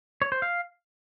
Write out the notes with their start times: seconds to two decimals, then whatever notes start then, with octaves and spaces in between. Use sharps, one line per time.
0.22 C#5
0.32 C5
0.42 F5